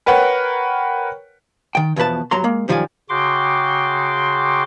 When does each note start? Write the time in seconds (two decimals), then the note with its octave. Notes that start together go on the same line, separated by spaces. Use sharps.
0.06 A#4 B4 C#5 F#5 G5
1.75 D#3 G5
1.96 E2 B2 F3 B4 A5
2.31 G2 F#3 A#5 C6
2.44 G#3 A#3
2.68 F#2 D#3 F3 G3 D5 G#5
3.09 C#3 F#4 G5 C6 D6